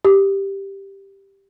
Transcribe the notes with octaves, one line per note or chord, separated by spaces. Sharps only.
G4